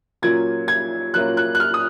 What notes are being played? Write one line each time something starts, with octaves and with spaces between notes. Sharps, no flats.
A#2 F#3 A#3 C#4 F4 G#6
G#6
A#2 F#3 A#3 C#4 F4 F#6
F#6
F#6
F6
D#6